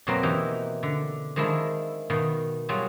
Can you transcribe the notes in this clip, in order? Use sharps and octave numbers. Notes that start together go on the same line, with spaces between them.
F2 B2 F#3 A#3 C4 A#4
E3 D#4 G4
D3
D#3 F3 G#3 D4 E4
B2 D#3 F5
F#3 G3 F4 G#4 C#5